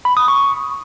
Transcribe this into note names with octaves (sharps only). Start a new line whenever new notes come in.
B5
D#6
C#6